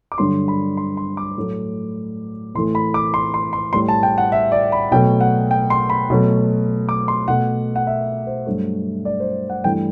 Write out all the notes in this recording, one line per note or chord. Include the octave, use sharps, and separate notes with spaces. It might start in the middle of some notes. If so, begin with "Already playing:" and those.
D6
G2 D3 F#3 C6
B5
C6
C6
D6
A2 F#3 A3
A2 E3 A3 C6
B5
D6
C6
C6
C6
A2 G3 C6
A5
G5
F#5
E5
D5
B5
B2 F#3 A3 G5
F#5
G5
C6
B5
B2 F#3 A3
D6
C6
B2 A3 F#5
F#5
E5
C5
G2 F#3 A3
D5
C5
F#5
G2 E3 A3 G5